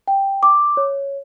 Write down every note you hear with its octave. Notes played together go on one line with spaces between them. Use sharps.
G5
D6
C#5